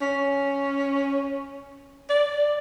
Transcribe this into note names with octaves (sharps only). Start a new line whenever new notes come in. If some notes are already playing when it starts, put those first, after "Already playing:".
C#4
D5